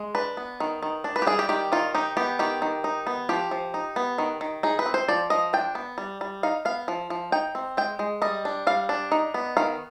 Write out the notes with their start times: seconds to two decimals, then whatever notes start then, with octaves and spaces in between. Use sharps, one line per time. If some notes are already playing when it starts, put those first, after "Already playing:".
Already playing: G#3
0.15 D4 B4
0.37 B3
0.60 D#3
0.83 D#3
1.04 D4
1.16 B4
1.22 G4
1.27 G3 G#4
1.39 G4
1.49 D#3 G4
1.72 D#3 F4
1.95 D#4 G4
2.17 B3 G4
2.39 D#3 G4
2.62 D#3
2.84 D#4
3.07 B3
3.29 F3 G4
3.51 F3
3.74 D#4
3.96 B3
4.18 D#3
4.41 D#3
4.63 D#4 G#4
4.79 B4
4.86 C4
4.94 C5
5.08 F3 D5
5.30 F3 D#5
5.53 D4 G5
5.75 B3
5.98 G3
6.21 G3
6.43 D#4 F5
6.65 B3 F5
6.88 F3
7.10 F3
7.32 D#4 G5
7.55 C4
7.77 G#3 G5
7.99 G#3
8.22 G3 D#5
8.45 D4
8.67 G3 F5
8.89 D4
9.12 D#4
9.34 B3
9.57 D#3 F5